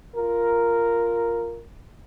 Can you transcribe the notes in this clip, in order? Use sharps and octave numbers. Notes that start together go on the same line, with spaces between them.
F4 A#4